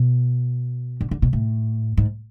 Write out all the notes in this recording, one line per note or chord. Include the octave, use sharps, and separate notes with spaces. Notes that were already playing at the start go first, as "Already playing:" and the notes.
Already playing: B2
D3
D3
B2
A2
G#2